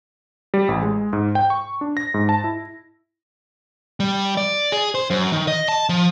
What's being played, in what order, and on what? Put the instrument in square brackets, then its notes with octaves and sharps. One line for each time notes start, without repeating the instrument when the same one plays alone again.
[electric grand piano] G3
A1
G#3
G#2
G5
C#6
D4
A#6
G#2
A5
E4
[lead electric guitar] G3
D5
G#4
C5
F#2
D#3
D#5
A5
F3